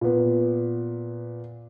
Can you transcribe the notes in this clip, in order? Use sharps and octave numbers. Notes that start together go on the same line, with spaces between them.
A#2 B3